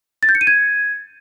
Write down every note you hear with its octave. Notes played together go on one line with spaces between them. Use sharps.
A6
G6
C#7
D#7
G#6